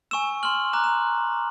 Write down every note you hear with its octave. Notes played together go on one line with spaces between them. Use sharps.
G#5 C#6 E6 E7
C6 F6 F#7
A#5 D6 F#6 E7
E7